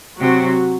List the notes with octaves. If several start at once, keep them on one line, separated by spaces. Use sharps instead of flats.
C3 F#3 F#4